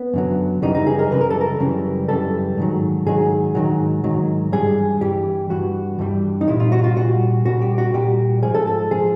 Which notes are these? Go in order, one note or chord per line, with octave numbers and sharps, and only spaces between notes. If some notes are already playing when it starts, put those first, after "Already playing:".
Already playing: B3
F#2 D3 F#3
F#2 C#3 E3 G3 D#4
D#4
G#4
A#4
F#2 C#3 E3 G3 B4
A#4
A4
A#4
F#2 C#3 E3 G3
F#2 C#3 E3 G3 A4
G#2 D#3 F#3
G#2 D#3 F#3 G#4
G#2 D#3 F#3
G#2 D#3 F#3
G2 E3 G3 G#4
G2 E3 G3 G4
G2 E3 G3 F#4
G2 E3 G3
D#4
A#2 G3 E4
F4
F#4
F4
A#2 G3 F#4
A#2 G3 F#4
G4
F#4
A#2 G3 G4
G#2 F3 G#4
A4
A4
F3 G#4